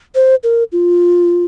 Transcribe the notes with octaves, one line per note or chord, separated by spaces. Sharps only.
C5
A#4
F4